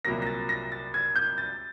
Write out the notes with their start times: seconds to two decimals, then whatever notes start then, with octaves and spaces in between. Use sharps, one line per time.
0.05 C2 A#2 F#3 A#3 A#6
0.22 A#6
0.27 A6
0.49 A#6
0.72 A6
0.94 G#6
1.16 G6
1.38 A6